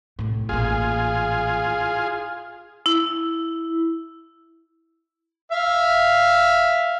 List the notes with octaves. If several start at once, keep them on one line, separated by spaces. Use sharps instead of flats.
A2 C3
A1 A#2 F4 G#4
E4
E4
E5 F5